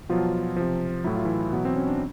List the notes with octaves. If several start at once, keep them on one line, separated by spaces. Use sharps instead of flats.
B2 F3 F#3 F4
C3 F3
A2 F#3 E4
F4
E3 E4
B2 F#3 B3
C4
C#4
D4